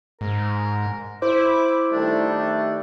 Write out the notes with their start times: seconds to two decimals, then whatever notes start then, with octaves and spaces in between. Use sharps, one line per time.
0.21 G#2 A#4
1.22 E4 C5 D6
1.92 D#3 G3 A3 D4